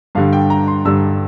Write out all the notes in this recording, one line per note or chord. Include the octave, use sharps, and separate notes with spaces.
G2 D3 G3 F5
G5
A#5
C6
G2 D3 G3 E6